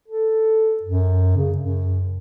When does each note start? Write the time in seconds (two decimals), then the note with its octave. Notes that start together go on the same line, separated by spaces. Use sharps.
0.08 A4
0.82 F#2
1.37 C#3
1.58 F#2